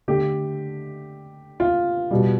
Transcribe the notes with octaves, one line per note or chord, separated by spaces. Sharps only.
D3 A3 G4
F4
B2 G3